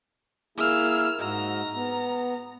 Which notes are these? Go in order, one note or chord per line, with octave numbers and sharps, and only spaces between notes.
A#3 E4 G#4 E6 F6
G#2 F#4 D#5 A#5
B3